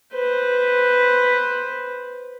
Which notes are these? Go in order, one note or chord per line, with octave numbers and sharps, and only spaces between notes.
B4 C5